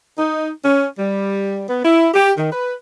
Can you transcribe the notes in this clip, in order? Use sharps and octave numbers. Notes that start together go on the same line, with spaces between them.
D#4
C#4
G3
B3
E4
G4
D#3
B4